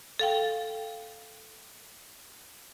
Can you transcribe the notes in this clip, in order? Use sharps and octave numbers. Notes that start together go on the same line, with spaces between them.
A4 F5 G5